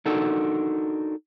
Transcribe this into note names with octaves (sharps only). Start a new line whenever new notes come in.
D4 D#4 F#4 A4 A#4